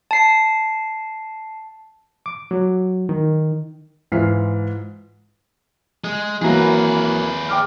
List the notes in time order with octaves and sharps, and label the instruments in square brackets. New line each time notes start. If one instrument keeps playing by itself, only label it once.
[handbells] A5 C7
[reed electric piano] D6
F#3
D#3
[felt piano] G#2 E3 F4 F6 B6 C7
[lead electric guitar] G#3
[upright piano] E3 F#3 A#3 [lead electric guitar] G#4 B4
[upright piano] G5 D6 F6